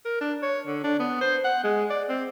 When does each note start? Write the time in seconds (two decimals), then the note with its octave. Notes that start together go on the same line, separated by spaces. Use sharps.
0.05 A#4
0.21 D4
0.42 C#5
0.67 D3
0.84 D4
0.99 B3
1.21 C5
1.44 F#5
1.64 G#3
1.90 D5
2.09 C4